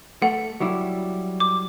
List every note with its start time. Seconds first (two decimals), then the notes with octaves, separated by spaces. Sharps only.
0.22 A3 F#5
0.60 F#3 G3 E4
1.40 D6